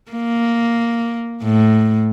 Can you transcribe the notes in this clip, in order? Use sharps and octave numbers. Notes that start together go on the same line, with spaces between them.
A#3
A2